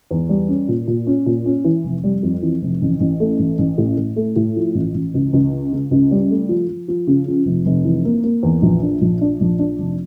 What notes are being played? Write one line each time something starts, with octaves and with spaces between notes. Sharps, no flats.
E2
G3
C#4
A#2
A#2
C#4
A#2
C#4
E3
F1
G3
F2
E3
F1
A1
A1
A3
A1
A1
A2
A2
A3
A2
F3
A1
A1
C#2
C#2
C#3
C#3
C#2
G3
A3
F3
F3
F3
C#3
F3
F1
F1
E3
A#3
A#3
E2
A#1
D4
A#1
D4
A#1
D4
F1